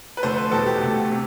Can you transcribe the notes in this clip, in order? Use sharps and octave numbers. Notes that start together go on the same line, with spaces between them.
B4
F2 D3 F3 A3 C5
B4
E2 B2 G3 A4
G4
D2 D3 A3
C3